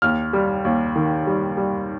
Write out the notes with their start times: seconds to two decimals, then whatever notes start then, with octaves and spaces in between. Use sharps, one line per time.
0.02 D#2 F6
0.33 G3
0.65 D#2
0.96 D#3
1.27 G3
1.57 G3